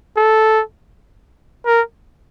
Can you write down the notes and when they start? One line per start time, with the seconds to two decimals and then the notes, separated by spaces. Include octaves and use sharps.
0.17 A4
1.66 A#4